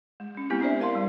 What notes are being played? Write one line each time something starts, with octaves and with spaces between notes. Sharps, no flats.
G#3
G#3 C#4
G#3 B3 C4 E4 G4
D4 G4 C5 D5 E5
A#4 F5 A5 C6
G3